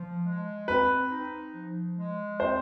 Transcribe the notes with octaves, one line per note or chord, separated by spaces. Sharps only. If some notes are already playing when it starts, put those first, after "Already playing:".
Already playing: F3
G#3
C4 B4
D#4
F3
G#3
C4 C5